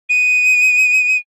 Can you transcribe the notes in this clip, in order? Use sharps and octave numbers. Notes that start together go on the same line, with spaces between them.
D#7